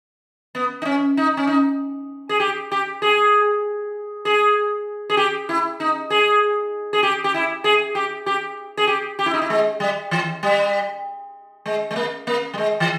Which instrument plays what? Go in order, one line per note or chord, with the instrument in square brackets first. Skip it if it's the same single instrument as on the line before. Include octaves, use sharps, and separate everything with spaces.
[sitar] B3
D#4
C#4
D#4
C#4
D#4
G#4
G4
G4
G#4
G#4
G#4
G4
E4
D#4
G#4
G#4
G4
G4
E4
G#4
G4
G4
G#4
G4
G4
E4
D#4
E4
G#3
G3
E3
G3
G#3
G#3
A#3
A#3
G3
G#3
E3